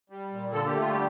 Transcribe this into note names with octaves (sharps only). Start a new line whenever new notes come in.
G3
A#2
D3 A4
G4
A3 F4
G3 G4